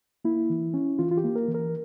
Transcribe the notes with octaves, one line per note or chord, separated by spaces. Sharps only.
A#3 E4
E3
C#4
E3 F4
F4
G4
A#3
A#4
E3
A#4